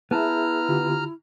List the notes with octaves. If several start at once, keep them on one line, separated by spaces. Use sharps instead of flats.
B3 E4 G#4 E5 A5 A#5 F6
D3 F4 G4